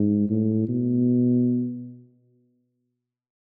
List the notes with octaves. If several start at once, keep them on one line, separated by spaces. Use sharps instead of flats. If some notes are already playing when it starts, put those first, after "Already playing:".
Already playing: G#2
A2
B2